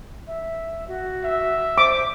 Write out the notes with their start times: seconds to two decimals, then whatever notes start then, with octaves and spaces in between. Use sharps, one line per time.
0.27 E5
0.88 F#4
1.24 E5
1.78 C5 D6